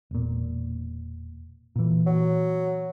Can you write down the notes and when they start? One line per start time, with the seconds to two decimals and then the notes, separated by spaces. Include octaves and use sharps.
0.11 E1 A#2
1.76 A#2 E3
2.06 F#3